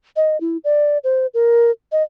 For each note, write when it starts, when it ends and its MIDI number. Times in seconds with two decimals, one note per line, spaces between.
0.16 0.40 75
0.41 0.57 64
0.64 0.98 74
1.04 1.26 72
1.34 1.71 70
1.92 2.03 75